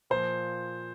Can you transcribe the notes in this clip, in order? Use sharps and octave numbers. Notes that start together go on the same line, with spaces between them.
A#2 F3 C5